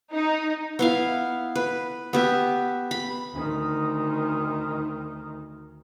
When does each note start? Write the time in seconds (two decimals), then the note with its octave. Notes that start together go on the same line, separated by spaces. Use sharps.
0.12 D#4
0.79 B3 E4 F5
1.55 B4
2.13 B3 G4 E5
2.91 B5
3.32 D2 D#3